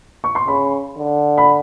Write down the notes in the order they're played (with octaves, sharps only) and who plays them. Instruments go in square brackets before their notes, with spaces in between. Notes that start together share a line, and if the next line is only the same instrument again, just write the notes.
[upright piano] C#6
C6
[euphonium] C#3 [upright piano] B5
[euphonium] D3
[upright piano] B5